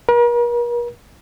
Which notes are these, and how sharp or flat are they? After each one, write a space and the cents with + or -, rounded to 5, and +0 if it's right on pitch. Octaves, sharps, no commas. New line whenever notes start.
A#4 +45